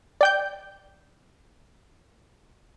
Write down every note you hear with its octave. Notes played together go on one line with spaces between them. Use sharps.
D5 G5 G6